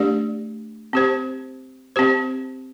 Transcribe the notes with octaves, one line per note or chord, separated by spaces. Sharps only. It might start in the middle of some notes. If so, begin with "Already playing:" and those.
Already playing: A3 D4 G4 D5
C4 G4 C5
C4 G4 C5